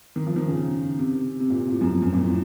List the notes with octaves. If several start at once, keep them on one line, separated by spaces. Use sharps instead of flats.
D#3
F3
D#3
C#3
C3
C3
A#2
C3
A2
F#2
F2
F#2
A#2
A2